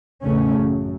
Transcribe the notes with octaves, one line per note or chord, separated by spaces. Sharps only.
A1 E2 A2 C#3 A3 C#4
F#2